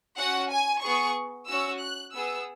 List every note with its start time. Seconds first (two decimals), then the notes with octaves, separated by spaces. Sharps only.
0.16 C#4 F#4 F#5
0.50 G#5
0.82 B3 G#4 C#6
1.48 C#4 F#4 E6
1.80 F#6
2.13 B3 G#4 E6